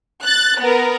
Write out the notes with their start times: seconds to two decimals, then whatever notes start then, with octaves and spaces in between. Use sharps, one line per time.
0.23 F#6 A6
0.59 B3 A#4